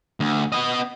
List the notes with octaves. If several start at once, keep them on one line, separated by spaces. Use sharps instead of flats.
D2
B3 D#5